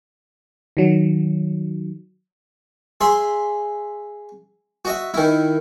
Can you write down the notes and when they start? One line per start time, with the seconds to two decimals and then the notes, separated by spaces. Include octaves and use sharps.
0.77 D#3 F#3
3.01 G#4 E5 C6
4.85 F#4 D#5 E5
5.14 D#3 E4